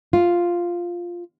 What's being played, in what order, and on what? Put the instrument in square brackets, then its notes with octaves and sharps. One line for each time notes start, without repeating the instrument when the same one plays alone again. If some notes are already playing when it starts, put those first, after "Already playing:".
[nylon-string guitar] F4